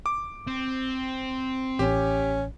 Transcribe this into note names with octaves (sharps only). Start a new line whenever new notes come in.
D6
C4
A1 C#4 G4